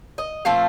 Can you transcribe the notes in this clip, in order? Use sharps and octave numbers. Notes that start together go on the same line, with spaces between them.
D#5
A#2 F3 A3 C4 F5